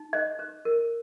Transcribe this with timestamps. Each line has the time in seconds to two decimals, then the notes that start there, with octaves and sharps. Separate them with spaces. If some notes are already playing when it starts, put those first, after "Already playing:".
Already playing: D#4
0.13 C5 D#5
0.39 C5
0.65 A#4